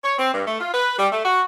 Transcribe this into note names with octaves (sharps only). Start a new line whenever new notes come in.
C#5
C4
G2
A3
F4
B4
G3
A3
F#4